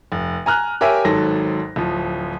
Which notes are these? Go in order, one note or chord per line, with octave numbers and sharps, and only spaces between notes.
F1
G#5 A#5 F6 F#6
G4 A#4 C#5 E5 G#5
G#1 G#2 F#3 A4 A#6
D1 F3